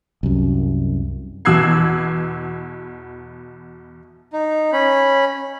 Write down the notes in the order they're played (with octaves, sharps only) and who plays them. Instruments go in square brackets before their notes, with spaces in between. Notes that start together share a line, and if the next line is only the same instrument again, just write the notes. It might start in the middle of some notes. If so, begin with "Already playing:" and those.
[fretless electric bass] C2 F#2
[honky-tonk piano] E2 B2 E6 F#6 G#6 C7
[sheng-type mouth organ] D#4
C#4 B5